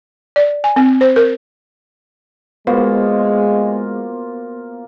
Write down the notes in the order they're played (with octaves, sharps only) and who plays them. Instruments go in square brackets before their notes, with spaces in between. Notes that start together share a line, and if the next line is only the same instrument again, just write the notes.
[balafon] D5
G#5
C4
C5
A#4
[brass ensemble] G#3 [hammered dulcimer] A#3 F4 F#4 [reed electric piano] B3 C5